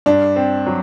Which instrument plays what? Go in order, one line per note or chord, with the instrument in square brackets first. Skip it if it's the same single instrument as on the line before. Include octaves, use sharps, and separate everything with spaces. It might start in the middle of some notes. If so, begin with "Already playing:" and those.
[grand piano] G2 [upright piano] D4
[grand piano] C4
F#3